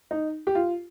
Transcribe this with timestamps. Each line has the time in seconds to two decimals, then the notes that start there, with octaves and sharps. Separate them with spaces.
0.11 D#4
0.47 G4
0.55 F4